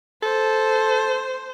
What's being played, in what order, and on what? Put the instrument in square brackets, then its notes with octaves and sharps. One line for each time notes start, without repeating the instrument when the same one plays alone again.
[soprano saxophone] A4 [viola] C5